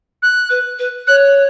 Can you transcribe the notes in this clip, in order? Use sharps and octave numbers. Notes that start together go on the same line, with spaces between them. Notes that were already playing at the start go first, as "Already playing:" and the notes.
F#6
B4
B4
C#5 F#6